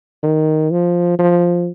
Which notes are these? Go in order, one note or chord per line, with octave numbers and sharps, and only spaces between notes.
D#3
F3
F3